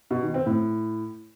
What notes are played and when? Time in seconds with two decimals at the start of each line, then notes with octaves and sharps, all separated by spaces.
0.11 B2
0.22 D#3
0.34 C4
0.46 A2